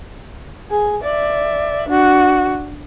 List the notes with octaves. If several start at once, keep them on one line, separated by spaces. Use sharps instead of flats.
G#4
D5 E5
D4 F#4